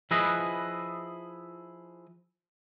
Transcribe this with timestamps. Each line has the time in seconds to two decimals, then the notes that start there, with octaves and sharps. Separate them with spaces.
0.11 F3 E4 G#4 B4 D#5